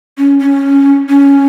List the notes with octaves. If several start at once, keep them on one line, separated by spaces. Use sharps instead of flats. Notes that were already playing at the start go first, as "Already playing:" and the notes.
C#4
C#4
C#4